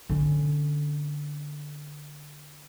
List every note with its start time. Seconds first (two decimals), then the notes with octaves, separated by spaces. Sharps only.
0.10 D3 C#4